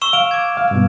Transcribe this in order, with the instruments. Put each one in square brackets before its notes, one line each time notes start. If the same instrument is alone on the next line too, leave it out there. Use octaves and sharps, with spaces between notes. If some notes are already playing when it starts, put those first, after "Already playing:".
[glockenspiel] C#6 E6 E7
[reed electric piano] F5 [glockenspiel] D7 E7 F7
[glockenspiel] D6 G#6
[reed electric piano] F5
G2 B2